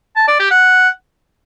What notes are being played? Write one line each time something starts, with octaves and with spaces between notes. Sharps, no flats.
A5
D5
G4
F#5